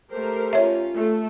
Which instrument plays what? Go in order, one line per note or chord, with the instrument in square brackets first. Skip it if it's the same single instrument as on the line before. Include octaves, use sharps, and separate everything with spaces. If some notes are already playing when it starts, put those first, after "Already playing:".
[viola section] A3 G4 A#4 [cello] C5
[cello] C#4 F4 [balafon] C#5 E5
[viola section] A3